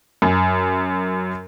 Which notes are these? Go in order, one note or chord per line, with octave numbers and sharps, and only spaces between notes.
F#2